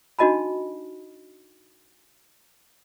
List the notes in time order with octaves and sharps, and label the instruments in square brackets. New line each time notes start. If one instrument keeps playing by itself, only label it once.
[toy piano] D4 D#4 F#4 D#5 A5 B5